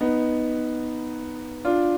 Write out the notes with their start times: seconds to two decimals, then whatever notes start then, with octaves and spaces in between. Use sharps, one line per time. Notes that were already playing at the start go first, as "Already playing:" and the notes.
0.01 B3 D#4
1.65 D4 F4